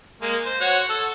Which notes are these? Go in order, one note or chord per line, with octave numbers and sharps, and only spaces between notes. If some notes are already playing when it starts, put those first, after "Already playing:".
G#3 A#3
C5
F#4 C#5 F#5
A4